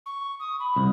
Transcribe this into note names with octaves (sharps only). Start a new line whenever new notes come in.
C#6
D#6
B5
C2